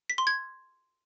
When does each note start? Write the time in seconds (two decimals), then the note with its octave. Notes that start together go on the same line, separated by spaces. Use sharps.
0.10 B6
0.18 C6
0.27 G#6